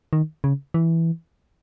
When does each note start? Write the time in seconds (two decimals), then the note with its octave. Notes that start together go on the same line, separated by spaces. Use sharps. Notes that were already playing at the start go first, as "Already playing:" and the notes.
0.13 D#3
0.44 C#3
0.74 E3